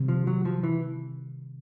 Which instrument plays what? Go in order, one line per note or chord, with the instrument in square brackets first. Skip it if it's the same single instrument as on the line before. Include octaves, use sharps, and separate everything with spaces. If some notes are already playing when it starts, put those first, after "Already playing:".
Already playing: [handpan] C3 D#3 G3
[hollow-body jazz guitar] F3
F#3
F3
E3